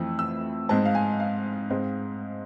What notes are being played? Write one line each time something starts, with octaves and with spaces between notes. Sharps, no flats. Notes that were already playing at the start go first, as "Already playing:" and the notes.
Already playing: F2 E3 A3 C4 E6
E6
G#2 G#3 C4 A5
F5
G#5
F5
G#2 G#3 C4